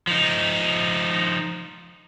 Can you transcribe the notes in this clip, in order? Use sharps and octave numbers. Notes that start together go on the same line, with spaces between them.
F3 D#4